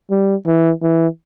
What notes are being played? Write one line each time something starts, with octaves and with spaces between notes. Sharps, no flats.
G3
E3
E3